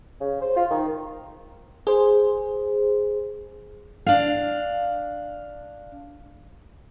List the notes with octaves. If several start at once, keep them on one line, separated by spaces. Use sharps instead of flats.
C#3
C5
F4
D#3
G#4 C5
D4 F5